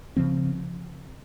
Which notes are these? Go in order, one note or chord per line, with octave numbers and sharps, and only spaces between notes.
C#3 F3 C4